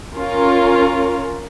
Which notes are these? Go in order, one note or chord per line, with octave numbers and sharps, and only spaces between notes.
C#4 F4 A#4